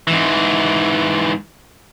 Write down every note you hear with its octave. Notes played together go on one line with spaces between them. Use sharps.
G#2 E3